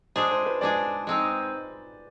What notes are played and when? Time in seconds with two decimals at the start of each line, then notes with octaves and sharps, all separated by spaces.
0.16 G#3 D4 G#4 C5
0.31 C5
0.46 B4
0.61 G#3 D4 G#4 D5
1.07 G#3 C4 D#4